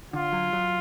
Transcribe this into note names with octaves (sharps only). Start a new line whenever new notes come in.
D3 F4
F#3
F#3